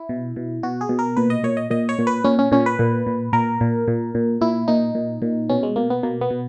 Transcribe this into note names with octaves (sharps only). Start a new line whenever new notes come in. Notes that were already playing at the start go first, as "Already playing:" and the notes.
Already playing: E4
B2
B2
B2 F#4
G#4
B2
A#4
A#2 B4
D#5
A#2 C#5
D#5
A#2 D#5
C#5
A#2
B4
A#2 C#4
C#4
A#2 C#4
B4
A#2
A#2
A#2 A#4
A#2
A#2
A#2
A#2 E4
A#2 D#4
A#2
A#2
B2 C#4
G#3
B2 A#3
B3
B2 A#3
B3
B2